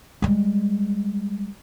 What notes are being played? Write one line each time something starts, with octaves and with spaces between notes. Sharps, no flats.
G3 G#3